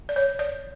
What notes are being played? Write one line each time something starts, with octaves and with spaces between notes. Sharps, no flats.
D5
C#5
D5